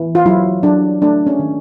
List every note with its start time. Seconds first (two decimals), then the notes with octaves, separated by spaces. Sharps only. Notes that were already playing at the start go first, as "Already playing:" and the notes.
Already playing: E3
0.15 F4
0.26 F#3 E4
0.63 F#3 D4
1.02 A3 D4
1.27 C#4
1.39 D#3